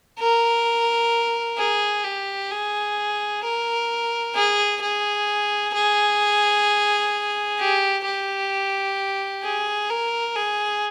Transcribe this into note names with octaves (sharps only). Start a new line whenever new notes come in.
A#4
G#4
G4
G#4
A#4
G#4
G#4
G#4
G4
G4
G#4
A#4
G#4